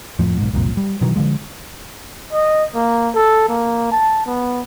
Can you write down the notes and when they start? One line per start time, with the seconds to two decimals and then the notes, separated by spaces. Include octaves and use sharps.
0.19 F2 A2 F3
0.37 B1 G#2
0.53 F#1 C2 F2 A#2
0.77 G3
1.01 B2 D#3 E3 F#3
1.16 D3 E3 F3 G#3
2.33 D#5
2.75 A#3
3.14 A4
3.49 A#3
3.92 A5
4.26 B3